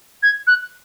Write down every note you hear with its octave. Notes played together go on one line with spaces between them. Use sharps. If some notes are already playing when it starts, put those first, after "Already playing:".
G#6
F#6